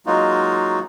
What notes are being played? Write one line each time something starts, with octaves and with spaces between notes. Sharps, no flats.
F#3 G#3 A#3 D#4 F4 F#4